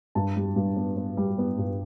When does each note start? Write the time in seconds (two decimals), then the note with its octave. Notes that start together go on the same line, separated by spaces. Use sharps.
0.15 G2 A5
0.36 G3
0.56 G2
0.77 B3
0.97 B3
1.17 G3
1.38 B3
1.58 G2